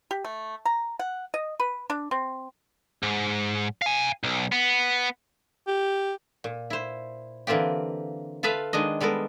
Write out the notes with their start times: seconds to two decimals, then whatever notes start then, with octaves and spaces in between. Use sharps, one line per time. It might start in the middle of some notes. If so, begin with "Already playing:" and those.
0.11 G4
0.25 A3
0.65 A#5
0.99 F#5
1.34 D#5
1.60 B4
1.90 D4
2.11 C4
3.03 G#2
3.82 F5 G#5
4.24 B1
4.52 B3
5.68 G4
6.44 A#2
6.70 E4 C5
7.47 D3 E3 A#3 C4 F4 G4
8.43 F4 A4 B4 E5 F5
8.73 D#3 G#3 D4 D#5
9.01 G3 G#3 B3 A4 A#4